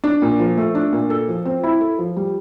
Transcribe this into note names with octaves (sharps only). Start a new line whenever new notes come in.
D4
A#2
F3
A3
D4
A#2
A4
F3
C4
E4
A4
F3
G3